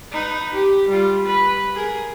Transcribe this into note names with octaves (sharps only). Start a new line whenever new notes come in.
D#4 B4
G4
G3 F4
B4
G#4 A#4